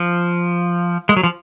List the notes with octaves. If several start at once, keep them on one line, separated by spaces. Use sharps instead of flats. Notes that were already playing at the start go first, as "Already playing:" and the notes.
Already playing: F3
G#3
F#3
F3